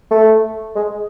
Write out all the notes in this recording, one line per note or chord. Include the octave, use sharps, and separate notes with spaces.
A3
G#3